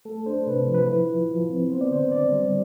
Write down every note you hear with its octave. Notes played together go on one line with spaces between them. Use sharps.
A3 A4
D4 C5
C3 B4
F3
B4
E4
F3
F3
C4
B3 C5
D5
D3 C5
D3 D5
G3